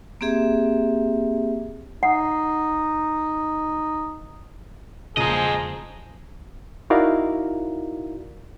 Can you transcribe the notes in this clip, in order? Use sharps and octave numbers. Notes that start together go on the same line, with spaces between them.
A#3 C4 G4 G#4 E5
D#4 F#5
E1 A#2 C#3 F3 G#4 C5 D#5 A#5
D#4 E4 F#4 A#4 D5 F5